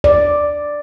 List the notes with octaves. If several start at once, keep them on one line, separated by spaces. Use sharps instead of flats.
D5